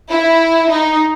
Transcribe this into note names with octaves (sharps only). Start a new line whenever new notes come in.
E4
D#4